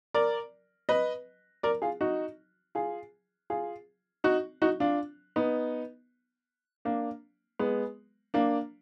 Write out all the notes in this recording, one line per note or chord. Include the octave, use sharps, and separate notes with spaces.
A#4 D5
B4 D#5
A#4 D5
F4 G#4
D#4 F#4
F4 G#4
F4 G#4
D#4 F#4
D#4 F#4
D4 F4
B3 D#4
A#3 D4
G#3 B3
A#3 D4